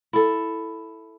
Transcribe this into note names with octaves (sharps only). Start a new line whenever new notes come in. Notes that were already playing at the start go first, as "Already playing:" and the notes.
E4 A4